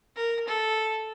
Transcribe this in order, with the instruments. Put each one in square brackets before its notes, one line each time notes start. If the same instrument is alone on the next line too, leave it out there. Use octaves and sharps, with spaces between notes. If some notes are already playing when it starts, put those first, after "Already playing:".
[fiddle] A#4
A4